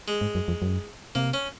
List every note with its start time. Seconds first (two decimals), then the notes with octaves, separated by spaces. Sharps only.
0.08 G#3
0.21 G#2
0.35 F#2
0.48 F2
0.62 F#2
1.15 C3 A#3
1.34 C#4